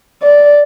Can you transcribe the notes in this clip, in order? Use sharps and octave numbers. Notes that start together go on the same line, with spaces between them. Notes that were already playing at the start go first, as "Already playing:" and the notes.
D5